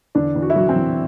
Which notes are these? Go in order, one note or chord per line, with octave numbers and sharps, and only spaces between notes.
E2 D3 D4
E2
F#4
E4
E3 F#3 F#4
C4
E3